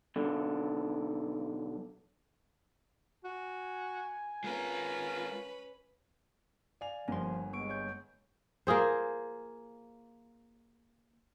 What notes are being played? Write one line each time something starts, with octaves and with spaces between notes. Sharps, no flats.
B1 D3
F#4 G#5
G#3 C#4 F4 A#4 B4
D5 F5 G#5 F7
G1 F3 A#3 G#5 C6
G#3 B3 C#6 D7
C#5 C#6 G6
A#3 F4 G#4 C5